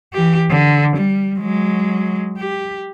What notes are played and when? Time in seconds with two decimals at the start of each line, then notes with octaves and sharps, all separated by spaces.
0.13 E3 G4
0.50 D3
0.96 G3
1.40 F#3 G#3
2.38 G4